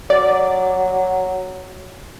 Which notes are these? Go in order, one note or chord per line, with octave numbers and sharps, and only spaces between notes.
F#3 D5